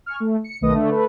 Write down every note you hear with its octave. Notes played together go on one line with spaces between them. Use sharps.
G#5 C#6 F6
A3
C#7
B1 D#3 A3 B4 D#5 D#6
D3 A3
A3 B4